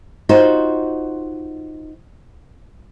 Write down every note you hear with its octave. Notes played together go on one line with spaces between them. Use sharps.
D#4 F4 F#4 C5